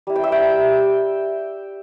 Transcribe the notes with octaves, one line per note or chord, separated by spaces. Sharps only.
G3 E4
G5
E5
G5